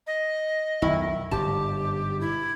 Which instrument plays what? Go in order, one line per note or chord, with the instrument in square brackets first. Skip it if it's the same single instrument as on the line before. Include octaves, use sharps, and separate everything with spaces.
[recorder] D#5
[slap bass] B1 F2 [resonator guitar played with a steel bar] D#3 E4
[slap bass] G1 G#2 B2 [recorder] G4 [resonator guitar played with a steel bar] A5
[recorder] E4